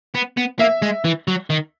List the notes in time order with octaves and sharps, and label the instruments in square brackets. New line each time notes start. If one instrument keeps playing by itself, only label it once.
[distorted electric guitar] B3
B3
[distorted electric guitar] A#3 [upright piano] E5
[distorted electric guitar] G#3
E3
F#3
D#3